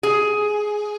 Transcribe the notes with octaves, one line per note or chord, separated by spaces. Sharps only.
G#4